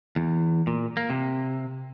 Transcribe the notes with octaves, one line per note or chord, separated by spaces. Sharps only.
E2
A#2
A#3
C3